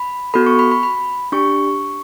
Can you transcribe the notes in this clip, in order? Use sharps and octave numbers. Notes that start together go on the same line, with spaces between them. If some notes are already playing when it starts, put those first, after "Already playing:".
Already playing: B5
B3 F#4 A4 B5
C#6
B5
B5
B5
D4 G4 C#6